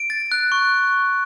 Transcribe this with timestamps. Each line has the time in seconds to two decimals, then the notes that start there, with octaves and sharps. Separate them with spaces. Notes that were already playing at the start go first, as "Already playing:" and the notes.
Already playing: D7
0.10 A6
0.32 F#6
0.52 C#6